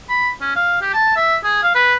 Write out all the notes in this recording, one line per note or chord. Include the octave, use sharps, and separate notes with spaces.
B5
C#4
F5
G4
A5
E5
G#4
F5
B4